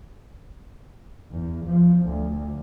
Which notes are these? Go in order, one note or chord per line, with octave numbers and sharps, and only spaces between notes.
E2
F3
D2